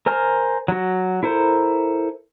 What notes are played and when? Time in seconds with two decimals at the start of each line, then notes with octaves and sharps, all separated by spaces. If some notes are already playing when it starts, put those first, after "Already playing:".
0.06 A#4 C5 G#5 F6
0.68 F#3 F#4
1.23 E4 A4 A#4 C5